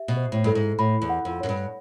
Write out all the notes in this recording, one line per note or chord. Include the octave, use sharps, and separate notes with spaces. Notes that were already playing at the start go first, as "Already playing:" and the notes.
Already playing: G4 E5
B2
C5
A2
G2 A4
G#2
A2 B5
E2
F#5
F2
F#2 C#5
G2